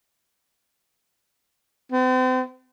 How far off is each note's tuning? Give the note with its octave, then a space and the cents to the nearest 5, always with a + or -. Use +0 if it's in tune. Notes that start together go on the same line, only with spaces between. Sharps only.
C4 -40